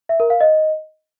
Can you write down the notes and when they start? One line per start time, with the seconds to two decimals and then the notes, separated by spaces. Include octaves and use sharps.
0.09 E5
0.20 A#4
0.30 F5
0.41 D#5